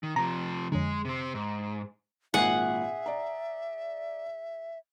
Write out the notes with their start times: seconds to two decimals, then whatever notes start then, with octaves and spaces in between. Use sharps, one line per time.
0.03 D#3
0.16 C3 F3 A#5
0.72 F2 D3 G#3
1.05 C3 C4
1.34 G#2
2.34 G#1 A#2 G#4 E5 F#5 C7
3.06 D5 A#5